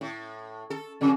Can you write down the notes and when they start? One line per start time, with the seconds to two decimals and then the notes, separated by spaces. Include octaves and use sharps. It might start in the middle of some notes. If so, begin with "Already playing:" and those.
0.01 A2
0.70 A4
1.01 F2 C#3